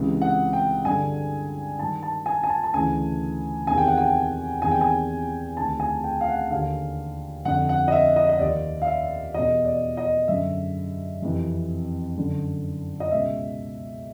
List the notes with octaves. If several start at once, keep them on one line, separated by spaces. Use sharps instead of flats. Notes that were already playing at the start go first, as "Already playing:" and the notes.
Already playing: C#2 C3 E3
F#5
G5
G2 D3 G#5
G2 D#3 A5
A5
G#5
G#5
A5
A5
D2 C#3 E3 G#5
E2 C3 D#3 G#5
G5
F#5
G5
E2 C3 D#3 G#5
G5
G#5
D2 C3 D#3 A5
G#5
G5
F5
F#5
D#2 D3 F5
F2 D3 F#5
F#5
D#5
E5
D#5
D#5
D#2 D#3 D5
F5
E5
E2 B2 D#5
D5
D#5
F#2 D3 E5
F2 C3 E3
F#2 D3
D#5
C#2 B2 E5